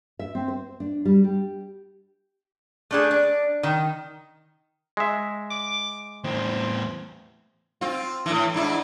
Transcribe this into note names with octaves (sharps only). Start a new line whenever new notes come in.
E5
C4
C5
D4
G3
G4
A3 D4 G#4
D4
D#3
G#3 E5
D6
E2 A2 C4
C4 F4
A2 E3
G#2 D4 E4